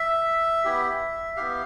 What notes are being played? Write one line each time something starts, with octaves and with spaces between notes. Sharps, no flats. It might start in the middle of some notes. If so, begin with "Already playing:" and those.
Already playing: E5
B3 E4 G4
B3 E4 G4 F5